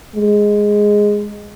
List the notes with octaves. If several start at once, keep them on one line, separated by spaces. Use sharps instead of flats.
G#3